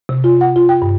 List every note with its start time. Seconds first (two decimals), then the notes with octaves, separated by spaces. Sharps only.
0.09 C3
0.24 F4
0.41 F#5
0.56 F4
0.69 G5
0.82 G2